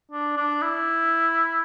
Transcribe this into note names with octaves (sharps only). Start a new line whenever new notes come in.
D4
D4
E4